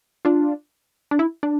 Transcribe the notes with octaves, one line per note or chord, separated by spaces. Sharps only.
D4 F4
D4
E4
D4